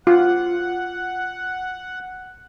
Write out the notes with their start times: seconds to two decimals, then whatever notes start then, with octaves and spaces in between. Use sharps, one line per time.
0.07 F4 F#5